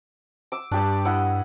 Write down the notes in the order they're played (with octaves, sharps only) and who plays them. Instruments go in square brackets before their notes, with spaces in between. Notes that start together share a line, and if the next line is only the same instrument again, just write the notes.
[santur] D6 E6
[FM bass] G2 [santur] D4 G4 D5
[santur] E4 D#5 F#5